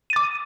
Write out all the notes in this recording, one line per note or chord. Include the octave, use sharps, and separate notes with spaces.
D6 A6 D#7